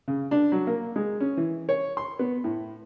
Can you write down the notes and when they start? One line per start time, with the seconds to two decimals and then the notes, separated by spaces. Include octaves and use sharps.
0.08 C#3
0.31 D4
0.52 F#3
0.67 A#3
0.96 G#3
1.21 C#4
1.37 E3
1.69 C#5
1.97 C6
2.19 B3
2.44 A2